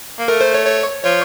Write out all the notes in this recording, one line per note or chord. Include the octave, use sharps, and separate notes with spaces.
A#3
A3 A#4
C5
C#5
C#5
F3 C#5